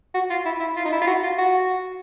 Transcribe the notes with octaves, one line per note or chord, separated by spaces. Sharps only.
F#4
F4
E4
E4
F4
D#4
E4
F4
F#4
F4
F#4